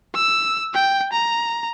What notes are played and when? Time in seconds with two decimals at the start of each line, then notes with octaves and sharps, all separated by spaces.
0.15 E6
0.74 G5
1.13 A#5